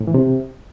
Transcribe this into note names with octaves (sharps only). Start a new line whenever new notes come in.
A2
E3
C3